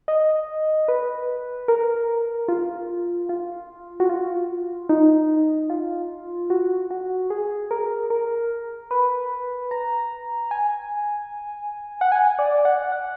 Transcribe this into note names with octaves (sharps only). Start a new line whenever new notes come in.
D#5
B4
A#4
F4
F4
F#4
F4
D#4
F4
F#4
F#4
G#4
A#4
A#4
B4
A#5
G#5
F#5
G#5
D5
F#5
F#5